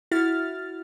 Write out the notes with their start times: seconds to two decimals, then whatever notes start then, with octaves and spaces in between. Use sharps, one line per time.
0.11 E4 F#4 F6 A6